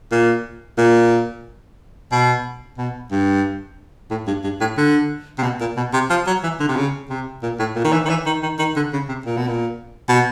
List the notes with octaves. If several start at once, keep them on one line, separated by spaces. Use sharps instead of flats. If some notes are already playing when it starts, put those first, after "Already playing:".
A#2
A#2
B2
B2
G2
A2
G2
G2
A2
D3
C3
B2
A#2
B2
C3
F3
F#3
E3
D3
C3
C#3
C3
A#2
A2
A#2
D#3
E3
D#3
E3
D#3
D#3
D#3
D3
C#3
C3
A#2
B2
A#2
B2